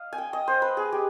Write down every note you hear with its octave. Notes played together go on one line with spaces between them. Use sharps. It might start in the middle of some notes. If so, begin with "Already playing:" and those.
Already playing: D#5 F5
G#5
G5
D#5
C5
B4
G#4
G4